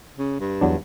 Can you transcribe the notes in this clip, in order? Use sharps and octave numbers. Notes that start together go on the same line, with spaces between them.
C#3
G2
E2 F#3 D4